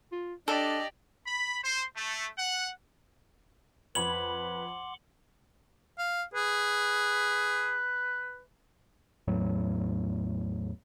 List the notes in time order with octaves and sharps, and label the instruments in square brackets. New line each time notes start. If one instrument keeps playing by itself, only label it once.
[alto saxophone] F4
[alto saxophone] D4 [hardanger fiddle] G4 D5 [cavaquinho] A4 [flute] D#5
[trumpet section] B5
C5
A3
F#5
[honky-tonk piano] F2 B5 G#6 [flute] B4 [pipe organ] F#5 C6 D6 [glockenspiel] F#7
[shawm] F5
[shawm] G#4 [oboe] B4
[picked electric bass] A1 E2 A2 F#3